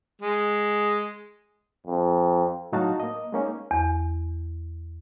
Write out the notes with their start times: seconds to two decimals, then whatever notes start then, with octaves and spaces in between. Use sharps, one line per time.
0.22 G#3
1.87 F2
2.72 A2 F#3 D#4 F#4 F5 A5
3.00 A#3 D#5
3.32 G#3 A#3 C#4 D#4
3.71 E2